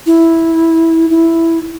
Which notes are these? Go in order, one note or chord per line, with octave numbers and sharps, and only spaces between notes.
E4
E4